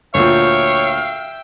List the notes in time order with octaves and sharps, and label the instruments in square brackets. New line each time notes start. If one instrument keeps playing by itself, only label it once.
[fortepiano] D2 A#2 [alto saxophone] C#5 [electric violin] E5 G5 [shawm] F5